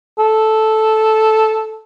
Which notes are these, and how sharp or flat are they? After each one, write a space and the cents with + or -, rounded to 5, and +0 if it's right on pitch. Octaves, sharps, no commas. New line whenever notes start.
A4 -5